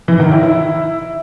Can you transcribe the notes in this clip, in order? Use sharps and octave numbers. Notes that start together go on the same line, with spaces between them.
E3
D#3
E4
E4